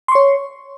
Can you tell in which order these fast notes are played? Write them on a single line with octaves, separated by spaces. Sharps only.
C6 C#6 C#5